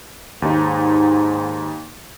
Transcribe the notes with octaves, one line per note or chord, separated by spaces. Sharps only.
D#2 G#2 D#4